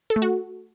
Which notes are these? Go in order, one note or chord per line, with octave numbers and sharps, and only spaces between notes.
A4
A3
F#4